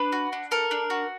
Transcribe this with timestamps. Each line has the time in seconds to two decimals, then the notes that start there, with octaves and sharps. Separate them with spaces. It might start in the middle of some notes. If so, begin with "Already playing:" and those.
Already playing: D4 B4
0.12 F#4
0.33 D4
0.51 A4 A#4
0.71 D4
0.90 F#4